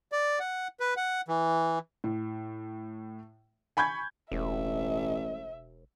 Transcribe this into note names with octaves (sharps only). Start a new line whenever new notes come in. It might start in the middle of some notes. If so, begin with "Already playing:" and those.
D5
F#5
B4
F#5
E3
A2
G#5 B5 C#6 G6 G#6
E1 A1 E5